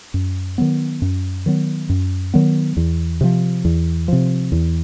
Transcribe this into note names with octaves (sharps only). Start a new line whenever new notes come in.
F#2
D#3 F#3 B3
F#2
D#3 F#3 B3
F#2
D#3 F#3 B3
E2
C3 F3
E2
C3 F3
E2